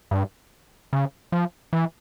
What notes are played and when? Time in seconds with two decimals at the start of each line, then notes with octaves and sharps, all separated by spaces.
0.11 G2
0.93 C#3
1.32 F3
1.73 E3